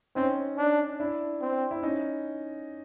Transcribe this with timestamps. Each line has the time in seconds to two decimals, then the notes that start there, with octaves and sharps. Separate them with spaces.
0.15 C4 C#4 D#4
0.58 D4
1.00 D4 E4
1.41 C4
1.71 E4
1.83 C#4 D#4